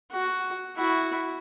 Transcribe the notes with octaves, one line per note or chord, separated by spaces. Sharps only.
F#4
E4 F#4